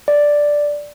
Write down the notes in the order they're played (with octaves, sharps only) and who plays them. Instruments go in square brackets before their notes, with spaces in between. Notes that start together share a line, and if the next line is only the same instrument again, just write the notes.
[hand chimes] D5